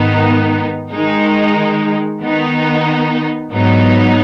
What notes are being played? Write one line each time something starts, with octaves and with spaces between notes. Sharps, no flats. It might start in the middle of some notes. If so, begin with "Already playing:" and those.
Already playing: G#2 D#3 B3 D#4
D#3 G#3 D#4
D#3 B3 D#4
G#2 F#3 B3 D#4